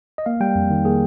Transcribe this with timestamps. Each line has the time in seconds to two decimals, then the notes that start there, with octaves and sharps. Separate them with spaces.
0.18 D#5
0.26 A#3 F5
0.40 G3 G5
0.55 F2
0.70 D#3
0.85 A#3 G#4